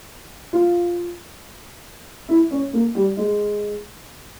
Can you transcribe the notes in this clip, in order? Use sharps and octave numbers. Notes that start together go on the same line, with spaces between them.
F4
E4
C#4
A#3
G3
G#3